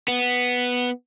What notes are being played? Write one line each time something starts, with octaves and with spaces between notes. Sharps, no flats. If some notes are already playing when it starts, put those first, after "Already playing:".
B3